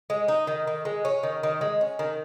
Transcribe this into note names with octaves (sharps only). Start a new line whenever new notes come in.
G#3
D#4
D#3
D#3
G#3
C#4
D#3
D#3
G#3
C#4
D#3